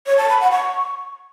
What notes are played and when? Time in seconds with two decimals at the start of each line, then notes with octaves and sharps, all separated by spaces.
0.06 C#5
0.18 A5
0.29 B5
0.40 F#5
0.52 C#6